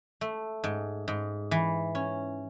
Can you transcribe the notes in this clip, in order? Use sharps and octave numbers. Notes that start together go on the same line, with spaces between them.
A3
G#2
G#2
E3
C#4